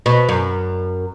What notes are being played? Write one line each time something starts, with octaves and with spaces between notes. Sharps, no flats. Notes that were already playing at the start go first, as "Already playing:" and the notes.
B2
F#2